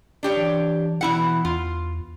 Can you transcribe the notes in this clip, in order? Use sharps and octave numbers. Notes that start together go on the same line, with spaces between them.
D4 G4 C#5
E3
B2 E3 E4 F#5
E2 F4